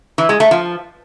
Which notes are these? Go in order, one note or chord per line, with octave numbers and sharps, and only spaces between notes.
E3
G#3
A3
F3